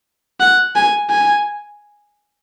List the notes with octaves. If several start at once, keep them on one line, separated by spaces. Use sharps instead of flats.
F#5
G#5
G#5